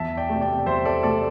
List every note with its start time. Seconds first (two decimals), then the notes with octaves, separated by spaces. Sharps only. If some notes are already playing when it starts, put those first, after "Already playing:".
Already playing: E2 E5 A5
0.17 D5 G5
0.29 C3 A3
0.41 D5 G5
0.66 E2 C5 E5
0.85 A4 D5
1.03 C3 A3 A4 D5